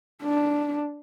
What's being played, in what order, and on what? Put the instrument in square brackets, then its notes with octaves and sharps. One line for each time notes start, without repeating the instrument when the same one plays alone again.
[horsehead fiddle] D4